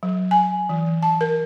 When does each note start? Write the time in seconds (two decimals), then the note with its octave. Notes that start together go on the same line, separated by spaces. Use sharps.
0.03 F#3
0.31 G#5
0.69 E3
1.02 A5
1.21 A#4